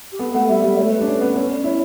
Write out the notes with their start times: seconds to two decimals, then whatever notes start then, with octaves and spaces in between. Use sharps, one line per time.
0.12 G4
0.19 B3 A4
0.34 A3 F#5
0.48 G3 E5
0.63 G3
0.77 A3 C#5
0.92 B4
1.01 D4
1.07 C#4
1.21 B3
1.36 C#4 A4
1.51 D5
1.64 E4 C#5